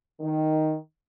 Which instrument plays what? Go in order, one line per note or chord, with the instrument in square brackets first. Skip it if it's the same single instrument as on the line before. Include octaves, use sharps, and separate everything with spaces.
[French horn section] D#3